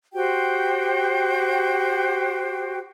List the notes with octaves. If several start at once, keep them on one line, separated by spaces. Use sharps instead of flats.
F#4 G4 C5 G5